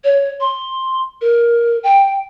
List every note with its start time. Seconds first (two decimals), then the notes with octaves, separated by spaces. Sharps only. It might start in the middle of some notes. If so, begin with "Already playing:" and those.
0.04 C#5
0.40 C6
1.21 A#4
1.83 G5